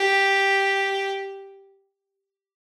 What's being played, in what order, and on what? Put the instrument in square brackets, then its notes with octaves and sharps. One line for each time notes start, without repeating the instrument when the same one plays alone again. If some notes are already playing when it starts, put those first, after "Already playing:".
Already playing: [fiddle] G4